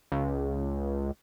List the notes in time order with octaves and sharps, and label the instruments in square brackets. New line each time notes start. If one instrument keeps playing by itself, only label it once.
[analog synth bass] C#2